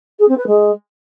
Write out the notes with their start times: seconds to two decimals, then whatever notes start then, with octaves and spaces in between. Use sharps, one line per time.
0.18 G#4
0.28 C4
0.37 B4
0.46 G#3